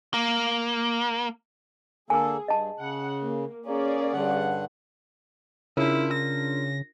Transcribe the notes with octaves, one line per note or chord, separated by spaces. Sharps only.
A#3
D3 A#3 G#4 A4 G#5 E6
G2 D#5 A5
C#3 F#5
A#3
A#3 C#4 G#4 D5
G2 D3 F#5
C#3 D4 E4 F4 A#4
A#6